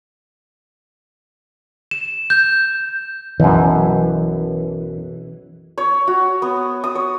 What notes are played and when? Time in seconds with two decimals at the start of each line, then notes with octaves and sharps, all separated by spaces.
1.91 E7
2.30 G6
3.40 B1 F#2 E3
5.78 C#5
6.08 F#4
6.42 B3
6.84 D#6
6.95 C#5